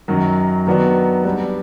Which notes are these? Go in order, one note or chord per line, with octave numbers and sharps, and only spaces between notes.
F#2 D#3 F#3
D#3 F#3 B3 D4 F#4
G3 B3 D4